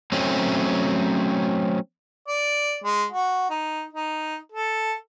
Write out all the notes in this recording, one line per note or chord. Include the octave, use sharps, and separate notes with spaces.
F#3 A3 C4 C#4
D5
G#3
F#4
D#4
D#4
A4